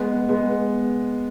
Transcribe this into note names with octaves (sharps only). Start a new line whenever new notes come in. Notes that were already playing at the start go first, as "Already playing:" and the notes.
Already playing: G#3 B3
G#3 B3